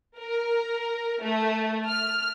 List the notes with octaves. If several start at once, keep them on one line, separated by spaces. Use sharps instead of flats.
A#4
A3
F6